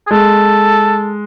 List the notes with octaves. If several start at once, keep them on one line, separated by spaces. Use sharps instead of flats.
G#4
G#3 A4